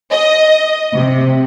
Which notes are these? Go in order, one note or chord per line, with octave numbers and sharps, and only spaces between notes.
D#5
C3